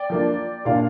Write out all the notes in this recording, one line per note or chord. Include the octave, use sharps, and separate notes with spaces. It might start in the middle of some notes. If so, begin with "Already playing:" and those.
Already playing: D5 G5
F3 A#3 D4
A#2 A#3 D4 F5